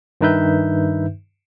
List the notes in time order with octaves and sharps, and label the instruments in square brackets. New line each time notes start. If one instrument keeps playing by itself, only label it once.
[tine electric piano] G2 D#3 D#4 B4 E5 G6